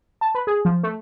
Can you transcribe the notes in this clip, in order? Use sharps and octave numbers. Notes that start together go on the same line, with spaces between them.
A5
B4
G#4
F3
A3